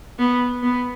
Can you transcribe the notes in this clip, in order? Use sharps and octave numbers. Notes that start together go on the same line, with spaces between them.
B3
B3